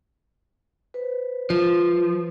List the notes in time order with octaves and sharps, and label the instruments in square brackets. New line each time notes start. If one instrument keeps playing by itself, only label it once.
[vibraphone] B4 C5
[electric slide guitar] F3